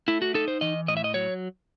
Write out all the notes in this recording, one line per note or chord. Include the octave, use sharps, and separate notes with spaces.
A3 E4
F#4
D#4 A4
C5
E3 D#5
A2 D#5
E5
D#5
F#3 C#5